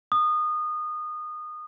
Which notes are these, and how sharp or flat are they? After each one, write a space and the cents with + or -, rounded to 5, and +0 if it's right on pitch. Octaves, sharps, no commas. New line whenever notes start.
D#6 -25